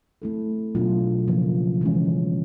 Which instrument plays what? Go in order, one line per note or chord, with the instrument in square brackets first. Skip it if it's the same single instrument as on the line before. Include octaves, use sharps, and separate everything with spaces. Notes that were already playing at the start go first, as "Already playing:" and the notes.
[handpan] A3 C4 E4 A4
B2 F#3 A#3 D4 F4
C#3 F3 A#3
E3 G#3 C#4